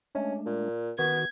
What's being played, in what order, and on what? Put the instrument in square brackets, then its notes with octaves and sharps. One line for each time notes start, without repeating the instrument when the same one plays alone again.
[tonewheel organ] G#3 A3 D4 [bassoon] C#4
[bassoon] A#2
[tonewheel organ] D#3 F#4 [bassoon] B3 [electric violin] G#6